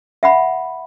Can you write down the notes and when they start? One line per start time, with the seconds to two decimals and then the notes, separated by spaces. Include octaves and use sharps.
0.23 E5 F#5 B5